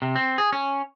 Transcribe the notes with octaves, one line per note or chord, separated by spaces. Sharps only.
C3
C4
G#4
C#4